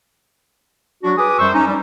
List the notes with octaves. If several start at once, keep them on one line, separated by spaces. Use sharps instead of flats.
F#3 D4 F#4
G#4 B4 D6 D#6
F#2 G3 C5 C#6 E6
C#4 D#4
G3